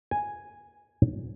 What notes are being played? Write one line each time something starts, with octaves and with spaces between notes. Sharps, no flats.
G#5